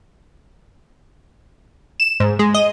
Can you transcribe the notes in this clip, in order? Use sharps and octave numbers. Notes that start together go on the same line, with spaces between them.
E7
G#2
G#3
D#5